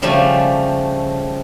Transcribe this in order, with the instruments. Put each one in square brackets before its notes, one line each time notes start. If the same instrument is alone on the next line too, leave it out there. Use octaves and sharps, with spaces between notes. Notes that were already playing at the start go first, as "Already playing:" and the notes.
[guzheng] C#3 F3 G3 A3 G#5